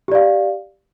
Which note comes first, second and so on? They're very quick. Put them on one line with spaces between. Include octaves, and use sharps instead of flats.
G4 D5 F5